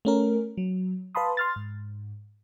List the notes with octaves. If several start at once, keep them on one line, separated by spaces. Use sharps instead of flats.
A3 C#4 A#4
F#3
B4 F5 A5 B5 C6 D#6
C6 F6 A6
G#2